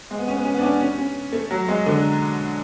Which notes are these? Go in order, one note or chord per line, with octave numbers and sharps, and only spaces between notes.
G#3
B3
C#4
B3
C#4
B3
D4
C#4
C#4
C#4
A3
F#3
G#3
D3